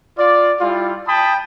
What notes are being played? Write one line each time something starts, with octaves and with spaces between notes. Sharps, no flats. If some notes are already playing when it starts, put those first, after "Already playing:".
F4 D5
G3 E4 F4
G5 A5 B5 D#6